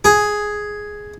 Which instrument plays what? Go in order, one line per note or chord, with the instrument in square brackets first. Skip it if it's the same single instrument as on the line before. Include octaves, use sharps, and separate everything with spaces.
[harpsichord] G#4